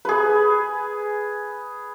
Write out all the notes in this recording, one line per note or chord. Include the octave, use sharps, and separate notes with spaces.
G#4 B4